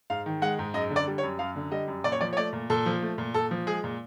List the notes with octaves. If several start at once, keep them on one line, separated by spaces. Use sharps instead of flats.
G#2 F5
D#3
G#3 F#5
G#2
F#2 D#5
D3
D5
G3
C#5
F#2
F#2 F5
D3
G3 D#5
F#2
A#2 D5
C#5
F3 D5
C#5
A3 D5
A#2
A#2 A4
F3
A3
A#2
A#2 A4
F3
G#3 G#4
A#2